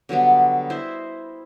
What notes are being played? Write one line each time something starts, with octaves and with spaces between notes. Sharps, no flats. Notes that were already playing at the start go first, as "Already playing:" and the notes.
D3 F#3 G3 B3
E4 C5 D#5 E5